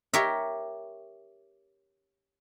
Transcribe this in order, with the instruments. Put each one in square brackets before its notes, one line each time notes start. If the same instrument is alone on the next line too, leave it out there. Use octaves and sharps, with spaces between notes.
[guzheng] G4 A#4 C#5 E5